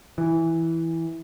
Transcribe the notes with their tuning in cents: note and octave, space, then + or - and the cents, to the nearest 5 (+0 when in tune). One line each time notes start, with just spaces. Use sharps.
E3 -5